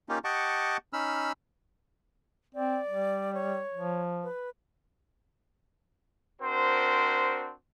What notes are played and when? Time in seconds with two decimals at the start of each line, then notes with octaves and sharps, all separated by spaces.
0.09 A#3 C#4 D#4 F4 G4
0.24 G4 D#5 F#5 A5 C#6 D6
0.93 C#4 D#4 B5 E6 F6
2.55 C4 D5
2.88 G3
3.34 C#5
3.74 F3
4.24 B4
6.41 C4 D4 F#4 A#4 C5